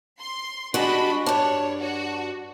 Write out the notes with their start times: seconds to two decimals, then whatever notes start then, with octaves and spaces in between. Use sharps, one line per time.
0.19 C6
0.74 G3 G#3 D4 F#4 D#5 B5
1.26 G2 D4 C#5
1.80 F#4